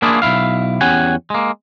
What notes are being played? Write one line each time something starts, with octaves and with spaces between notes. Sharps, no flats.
A#3 D4 E4 F4 G#4
B1 B2 E4 F5
E2 C#4 G4 F#5 G#5
G#3 A#3